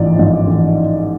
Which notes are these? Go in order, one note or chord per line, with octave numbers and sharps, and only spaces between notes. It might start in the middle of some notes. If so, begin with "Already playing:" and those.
Already playing: A1 G#2 F3 D5
G#2 F3
A1